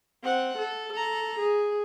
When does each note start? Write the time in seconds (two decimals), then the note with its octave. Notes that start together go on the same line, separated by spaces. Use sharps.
0.23 C4 F#5
0.58 A4
0.93 A4 A#5
1.39 G#4